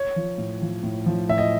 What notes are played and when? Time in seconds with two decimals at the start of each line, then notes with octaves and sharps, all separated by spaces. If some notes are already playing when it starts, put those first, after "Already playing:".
Already playing: C#5
0.16 F3
0.38 A2
0.62 F3
0.83 A2
1.06 F3
1.29 A2 E5
1.38 D#5